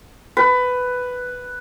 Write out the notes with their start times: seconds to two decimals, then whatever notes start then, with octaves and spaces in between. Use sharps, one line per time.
0.37 B4